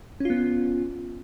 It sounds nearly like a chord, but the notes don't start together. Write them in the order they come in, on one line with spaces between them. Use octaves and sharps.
C#4 F4 B3